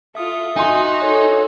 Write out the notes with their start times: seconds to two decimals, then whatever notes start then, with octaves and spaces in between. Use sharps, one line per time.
0.15 F4 A4 E5 D#6
0.56 D#4 F#4 G#5 C6
1.02 A4 C#5